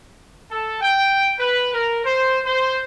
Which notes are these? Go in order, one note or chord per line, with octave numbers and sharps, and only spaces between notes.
A4
G5
B4
A#4
C5
C5